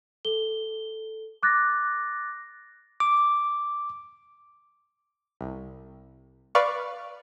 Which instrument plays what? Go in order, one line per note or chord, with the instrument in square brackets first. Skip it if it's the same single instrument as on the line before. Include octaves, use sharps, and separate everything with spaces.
[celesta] A4 G7
D6 F#6 A6 A#6
[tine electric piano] D6
[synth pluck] C2
B4 D5 F5 C#6